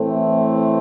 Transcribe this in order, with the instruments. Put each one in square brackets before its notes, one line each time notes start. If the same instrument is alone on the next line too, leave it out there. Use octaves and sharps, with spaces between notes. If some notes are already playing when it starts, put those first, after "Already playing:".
Already playing: [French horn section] A2 E3 A3 C4